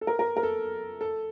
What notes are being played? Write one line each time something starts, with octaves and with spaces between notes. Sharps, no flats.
A4
A#4
A#4
A#4
A4
A4